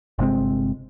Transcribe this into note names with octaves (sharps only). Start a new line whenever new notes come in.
G1 C3 G#3 C4